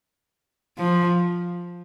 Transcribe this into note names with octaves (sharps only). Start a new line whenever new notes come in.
F3